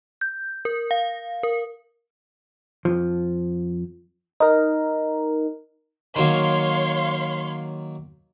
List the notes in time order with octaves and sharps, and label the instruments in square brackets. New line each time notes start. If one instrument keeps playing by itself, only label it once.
[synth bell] G6
A#4
F5
A#4
[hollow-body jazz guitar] F2 F3
[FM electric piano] D#4 A#4
[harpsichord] D#3 F#3 A#3 [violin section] C#5 F5 C6